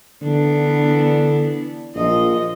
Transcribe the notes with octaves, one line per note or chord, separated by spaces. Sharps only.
D3 E3 B3 D4
A#1 F3 D#5